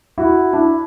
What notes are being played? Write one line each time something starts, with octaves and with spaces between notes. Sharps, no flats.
E4 F#4
D4 E4